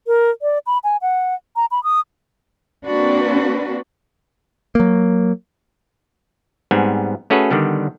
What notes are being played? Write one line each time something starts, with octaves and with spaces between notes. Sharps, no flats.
A#4
D5
B5
G#5
F#5
A#5
B5
D#6
A#3 C4 D4 F#4 B4
F#3 A#3
G#2 G3 B3 C4 G#5
A3 C#4 F#4 G#4 A4 B4
D3 D#3 G3 B3